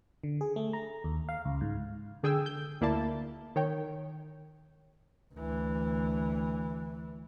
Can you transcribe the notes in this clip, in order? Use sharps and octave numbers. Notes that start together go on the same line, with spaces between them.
D3
G#4
A3
A#5
D#2
F5
C#2
G#2
D3 G#4 G5 G#5 E6
G6
D2 A#3 E4 D5 A5
D#3 C#5 G5
D2 E3